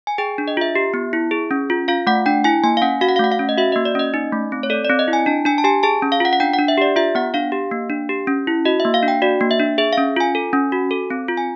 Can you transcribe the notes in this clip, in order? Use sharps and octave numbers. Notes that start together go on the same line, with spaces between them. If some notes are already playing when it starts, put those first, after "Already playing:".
G#5
G#4 G5
D4
D#5
F4 E5
G4
B3
E4
G#4
C#4
F4
F4 F5
A3 F#5
D4 G5
E4 G#5
A#3 G#5
F5
C#4 F#5
F#4 F5
F#5
F5
A3 F#5
F5
C#4
D#5
F#4 E5
A#3 D#5
D5
C#4 D#5
D#4
A3
C4
C#5
A4 D5
C4 D5
D#5
E4
G#5
D4 A5
D4 G#5
A5
G4 G#5
G#4 A5
C#4
F5
F4 F#5
F#5
D4 G5
F#5
D4
E5
G4 D5
F4 E5
B3 F#5
D4 F5
G4
A#3
D4
G4
C#4
E4
F#4 D#5
E5
A#3
F5
D4
G5
F#4 D5
A#3
E5
D4
G#4 E5
F5
C#4
F4 G#5
A4
C#4
F#4
A4
C4
F4
G#5